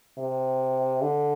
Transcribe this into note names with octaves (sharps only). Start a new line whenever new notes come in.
C3
D3